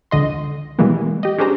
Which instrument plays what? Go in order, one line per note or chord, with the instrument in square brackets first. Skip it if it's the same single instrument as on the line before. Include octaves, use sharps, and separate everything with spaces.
[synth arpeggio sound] C#2 D3 D#5 C6
B2 E3 G3 G#3 A#3 B3
G4 D#5
C#4 D4 G4 G#4 C5 A#5